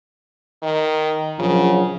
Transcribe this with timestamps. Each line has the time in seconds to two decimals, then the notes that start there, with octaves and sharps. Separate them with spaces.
0.63 D#3
1.39 A#1 C#3 F3 F#3